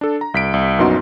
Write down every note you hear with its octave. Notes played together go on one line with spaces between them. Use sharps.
D4 A4
A#5
C2 B6 D7
C2
A#1 F#2 B3 D#4 F#4 C6